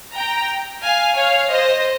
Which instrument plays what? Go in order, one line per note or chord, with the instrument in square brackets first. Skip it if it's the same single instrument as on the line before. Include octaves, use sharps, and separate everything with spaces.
[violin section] G5 A#5
F5 G#5
C#5 F5
C5 D#5